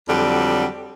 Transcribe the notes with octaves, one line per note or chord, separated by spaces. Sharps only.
F2 D3 F#3 G3